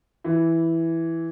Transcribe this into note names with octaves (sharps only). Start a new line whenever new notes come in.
E3